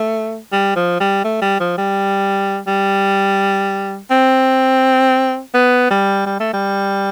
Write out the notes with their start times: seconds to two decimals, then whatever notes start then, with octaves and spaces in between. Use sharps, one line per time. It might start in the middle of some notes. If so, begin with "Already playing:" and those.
Already playing: A3
0.52 G3
0.75 F3
1.00 G3
1.24 A3
1.42 G3
1.60 F3
1.78 G3
2.67 G3
4.11 C4
5.54 B3
5.90 G3
6.26 G3
6.40 A3
6.53 G3